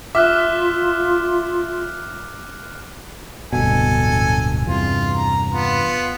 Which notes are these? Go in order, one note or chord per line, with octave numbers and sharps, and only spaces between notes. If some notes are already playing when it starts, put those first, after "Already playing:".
F4 E5 D6 F6 F#6
D1 G2 B2 A4 G#5
E2 G2 C3 F4
A#5
B3 F4